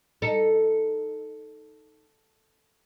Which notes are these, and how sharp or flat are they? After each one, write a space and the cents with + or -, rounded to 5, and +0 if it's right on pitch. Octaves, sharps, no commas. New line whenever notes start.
D#4 +0 A4 +0